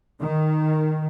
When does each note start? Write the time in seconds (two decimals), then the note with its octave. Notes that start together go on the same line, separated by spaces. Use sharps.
0.20 D#3